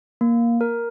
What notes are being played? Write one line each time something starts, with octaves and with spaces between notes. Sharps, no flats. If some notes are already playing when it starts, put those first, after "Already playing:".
A#3
A#4